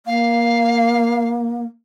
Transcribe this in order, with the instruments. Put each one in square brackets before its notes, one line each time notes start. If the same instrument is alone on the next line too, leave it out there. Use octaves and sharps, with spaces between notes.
[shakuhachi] A#3 [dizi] F5